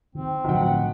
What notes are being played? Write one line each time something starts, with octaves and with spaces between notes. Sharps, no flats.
D#3 C4
B1 A2 D3 F3 F#5 G5